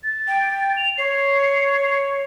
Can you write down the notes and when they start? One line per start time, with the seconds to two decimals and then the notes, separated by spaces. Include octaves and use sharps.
0.04 A6
0.28 G5
0.77 F7
0.98 C#5 C7